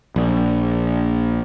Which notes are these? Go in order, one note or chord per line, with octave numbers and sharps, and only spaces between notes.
A#1